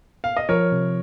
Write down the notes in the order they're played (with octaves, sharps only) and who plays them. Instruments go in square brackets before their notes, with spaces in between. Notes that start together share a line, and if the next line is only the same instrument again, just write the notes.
[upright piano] F5
D#5
[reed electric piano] F3 [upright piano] A#4 C#5
[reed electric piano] C3